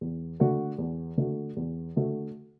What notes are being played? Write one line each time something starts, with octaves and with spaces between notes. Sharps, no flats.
E2
D3 A3 F#4
E2
D3 A3 F#4
E2
D3 A3 F#4